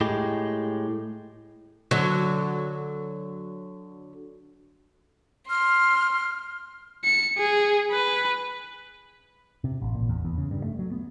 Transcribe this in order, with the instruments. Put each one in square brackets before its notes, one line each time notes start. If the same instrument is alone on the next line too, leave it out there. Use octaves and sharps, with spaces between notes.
[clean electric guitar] A2 G#3 G4
[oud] D3 F#3
[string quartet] C6 [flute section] F6
[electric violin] C#7
G#4
B4
[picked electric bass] C3
A1
A#2
E2
E2
C#3
G2
A3
F#3
B3